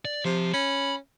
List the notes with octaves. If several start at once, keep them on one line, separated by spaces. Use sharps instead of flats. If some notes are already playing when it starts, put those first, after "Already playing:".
D5
C3 F3
C#4 B5